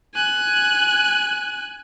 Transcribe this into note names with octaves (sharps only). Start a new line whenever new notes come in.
G#5 F#6